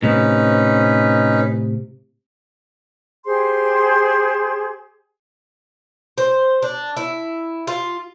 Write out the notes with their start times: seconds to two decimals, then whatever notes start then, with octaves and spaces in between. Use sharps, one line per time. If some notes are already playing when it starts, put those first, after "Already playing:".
0.03 A2 C3 C#4 D#4 B4
3.26 G4 G#4 C5 C6
6.18 C5
6.63 D4
6.97 E4
7.67 F4